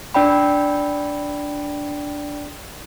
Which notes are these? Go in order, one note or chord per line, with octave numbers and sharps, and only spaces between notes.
D4 D5 G5 B5